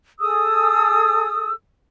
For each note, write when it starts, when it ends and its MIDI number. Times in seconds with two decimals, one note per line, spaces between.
0.19 1.52 68
0.19 1.52 69
0.19 1.52 87
0.19 1.52 88